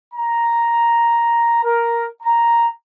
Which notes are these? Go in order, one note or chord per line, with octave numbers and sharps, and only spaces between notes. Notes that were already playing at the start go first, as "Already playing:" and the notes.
A#5
A#4
A#5